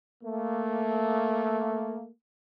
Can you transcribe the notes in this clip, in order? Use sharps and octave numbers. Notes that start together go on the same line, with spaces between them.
A3 A#3